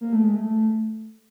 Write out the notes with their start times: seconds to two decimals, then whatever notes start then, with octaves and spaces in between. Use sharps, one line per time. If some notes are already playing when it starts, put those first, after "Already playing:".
0.01 A#3
0.13 A3
0.24 G#3
0.36 A3